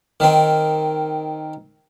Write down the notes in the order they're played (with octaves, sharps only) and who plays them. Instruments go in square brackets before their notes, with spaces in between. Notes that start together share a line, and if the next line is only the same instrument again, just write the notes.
[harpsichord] D#3 C4